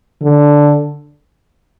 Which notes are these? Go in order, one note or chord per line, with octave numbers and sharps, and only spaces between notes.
D3